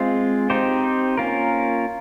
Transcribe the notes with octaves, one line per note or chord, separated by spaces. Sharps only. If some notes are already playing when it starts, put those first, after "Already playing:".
Already playing: G#3 C4 F4
C4 D#4 G4 C5
A#3 C#4 F4 A#4